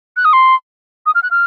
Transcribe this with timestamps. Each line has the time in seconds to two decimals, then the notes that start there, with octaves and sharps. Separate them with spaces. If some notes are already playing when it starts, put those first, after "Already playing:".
0.17 F#6
0.25 D#6
0.33 C6
1.06 D#6
1.15 F6
1.23 F#6
1.31 F6